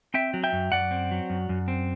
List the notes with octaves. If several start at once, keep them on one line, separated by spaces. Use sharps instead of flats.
C4 E5 G5
F#3
E5 G5
F#2
F#2 D5 F#5
C4
F#3
F#2
F#2
C4